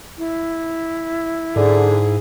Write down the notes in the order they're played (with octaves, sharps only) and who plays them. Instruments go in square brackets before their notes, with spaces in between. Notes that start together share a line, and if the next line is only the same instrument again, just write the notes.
[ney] E4
[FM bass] G#2 [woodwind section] D3 [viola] G#4